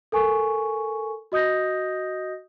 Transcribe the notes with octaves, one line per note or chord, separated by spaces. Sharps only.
A4 A#4 G#5 C#6
F#4 D#5 D#6 G6 A#6